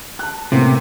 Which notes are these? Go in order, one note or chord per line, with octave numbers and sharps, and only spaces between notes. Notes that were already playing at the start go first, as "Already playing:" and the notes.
A5 F#6
A2 C3 A#3 B3